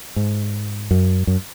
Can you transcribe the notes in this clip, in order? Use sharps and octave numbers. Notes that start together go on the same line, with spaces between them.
G#2
F#2
F#2